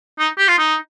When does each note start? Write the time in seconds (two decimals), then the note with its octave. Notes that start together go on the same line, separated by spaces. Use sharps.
0.19 D#4
0.38 G4
0.48 F4
0.58 D#4